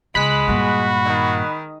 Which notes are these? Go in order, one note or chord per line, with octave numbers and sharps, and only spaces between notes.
C#2 G#3 B5 F#6 B6
G2 A#2 F#4
D#3